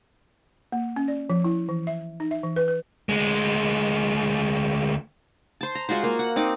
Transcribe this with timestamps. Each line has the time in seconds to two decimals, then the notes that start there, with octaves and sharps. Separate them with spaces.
0.72 A#3
0.96 C#4
1.08 D5
1.30 F3
1.44 E4
1.69 E3
1.87 E5
2.20 D#4
2.31 E5
2.44 E3
2.56 B4
2.68 B4
3.09 D2 G#3
5.61 C5 A5
5.75 A#5
5.89 G#3 F4 F#4 C5
6.03 A#3
6.19 F#5
6.36 C4 D#4 D6